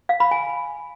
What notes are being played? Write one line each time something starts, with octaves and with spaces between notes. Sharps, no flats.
F5
B5
G#5